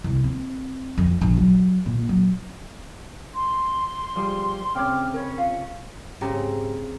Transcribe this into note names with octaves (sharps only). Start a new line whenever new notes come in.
C2
C4
F2
A#1
F#3
A#2
F#3
C6
F3 G3 G#4
C#3 C4 C#5 E5 G5 D6 F6
C#4 A#4 C#5 B5
F4 F5
G#2 C#3 C4 G4 A#5